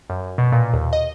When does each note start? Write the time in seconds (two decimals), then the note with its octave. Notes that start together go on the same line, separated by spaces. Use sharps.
0.10 F#2
0.38 B2
0.52 A#2
0.73 D#2
0.93 D#5